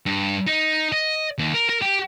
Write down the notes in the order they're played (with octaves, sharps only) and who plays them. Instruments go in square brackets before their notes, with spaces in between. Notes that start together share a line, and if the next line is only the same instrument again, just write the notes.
[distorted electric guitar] G2
D#4
D#5
D#2
A#4
A#4
G4